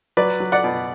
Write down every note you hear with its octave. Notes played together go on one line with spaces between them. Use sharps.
F#3 B4 D5
F#3
D5 F#5
B2